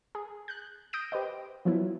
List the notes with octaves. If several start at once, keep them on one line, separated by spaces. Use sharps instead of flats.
G#4
F#6 G6
D#6 G6 A#6 D7 D#7
G4 B4 C5 D#5
F3 F#3 B3 E4